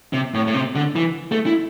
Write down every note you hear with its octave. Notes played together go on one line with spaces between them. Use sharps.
C3
A2
A2
C3
D3
E3
A3
E4